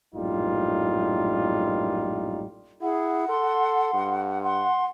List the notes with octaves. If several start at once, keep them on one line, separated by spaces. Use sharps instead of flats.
A#1 F#2 A2 G3 D#4 F4
E4 G#4 F#5
A4 C6
G2
F#5 C6